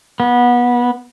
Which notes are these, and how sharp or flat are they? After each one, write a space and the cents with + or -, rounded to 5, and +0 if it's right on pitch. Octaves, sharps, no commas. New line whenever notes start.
B3 -25